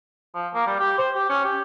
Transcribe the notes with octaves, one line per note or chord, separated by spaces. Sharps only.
F3
A#3
G3
G4
C5
G4
C#4
G4